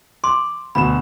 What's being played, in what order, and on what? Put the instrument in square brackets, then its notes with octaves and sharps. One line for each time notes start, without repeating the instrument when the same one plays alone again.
[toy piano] C6 [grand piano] D6
[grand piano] D2 B2 E7 [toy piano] B5